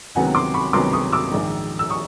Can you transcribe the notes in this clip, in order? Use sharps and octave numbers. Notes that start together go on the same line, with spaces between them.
C#2 C3 D#3 F#3 B3 F#5 G#5
C6 D6
B5 C#6
C#2 C3 D#3 F#3 B3 C6 D6
C#6 D#6
D6 E6
A#1 G#2 D#3
E6
C#6 D#6